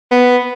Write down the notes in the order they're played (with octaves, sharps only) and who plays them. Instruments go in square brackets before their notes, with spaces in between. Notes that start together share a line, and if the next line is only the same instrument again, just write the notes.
[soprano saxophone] B3